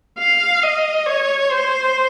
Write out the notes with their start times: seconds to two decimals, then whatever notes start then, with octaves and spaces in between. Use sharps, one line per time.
0.19 F5
0.63 D#5
1.06 C#5
1.51 C5